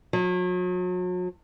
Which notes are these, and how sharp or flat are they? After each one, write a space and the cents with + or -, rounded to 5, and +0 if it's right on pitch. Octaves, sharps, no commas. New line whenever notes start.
F#3 -40